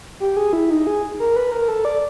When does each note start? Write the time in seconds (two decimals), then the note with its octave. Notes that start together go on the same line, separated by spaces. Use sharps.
0.20 G4
0.37 G#4
0.53 E4
0.70 D#4
0.87 G#4
1.19 A#4
1.36 B4
1.52 A#4
1.68 A4
1.85 D5